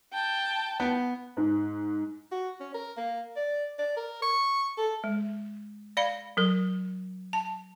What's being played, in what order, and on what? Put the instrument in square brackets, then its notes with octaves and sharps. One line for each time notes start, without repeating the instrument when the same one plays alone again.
[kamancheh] G5 A5
[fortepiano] B3
[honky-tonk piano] G#2
[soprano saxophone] F#4
C#4
A#4
A#3
D5
D5
A#4
C#6
A4
[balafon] G#3
D5 F5 B5
F#3 A#4
A5